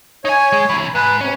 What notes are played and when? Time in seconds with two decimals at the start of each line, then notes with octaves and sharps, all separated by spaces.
0.25 D#4 C#5 G#5
0.52 G#3
0.70 C3 E3
0.95 G#2 B4
1.21 C3 C#4